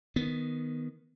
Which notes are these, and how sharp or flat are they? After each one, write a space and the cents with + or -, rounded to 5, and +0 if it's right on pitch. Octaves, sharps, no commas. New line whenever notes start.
D#3 +0 B3 +0